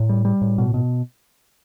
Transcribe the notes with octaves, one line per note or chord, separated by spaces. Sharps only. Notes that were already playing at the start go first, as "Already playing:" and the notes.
Already playing: A2
G3
G3
A2
B2
B2